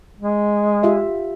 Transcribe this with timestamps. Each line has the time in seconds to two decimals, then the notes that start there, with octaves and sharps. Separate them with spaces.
0.20 G#3
0.83 F4 G4 E5